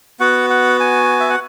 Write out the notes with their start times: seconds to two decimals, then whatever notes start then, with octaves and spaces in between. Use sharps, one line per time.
0.20 B3 F#4 F#5
0.50 F#5
0.80 G#5
1.20 E5
1.30 F#5